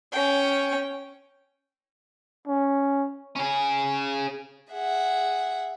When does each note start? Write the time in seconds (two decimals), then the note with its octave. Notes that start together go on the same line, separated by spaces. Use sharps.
0.12 C#4 G5
2.48 C#4
3.35 C#4 G#4
4.72 G#4 E5 F#5